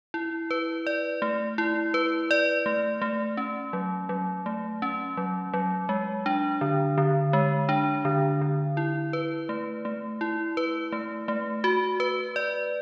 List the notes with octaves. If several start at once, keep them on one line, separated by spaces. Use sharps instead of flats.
E4
B4
D5
A3
E4
B4
D5
A3
A3
C#4
F#3
F#3
A3
C#4
F#3
F#3
G#3
D4
D3
D3
G#3
D4
D3
D3
E4
B4
A3
A3
E4
B4
A3
A3
F#4
B4
D5